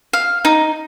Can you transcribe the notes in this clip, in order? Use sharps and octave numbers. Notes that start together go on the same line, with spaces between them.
F5
D#4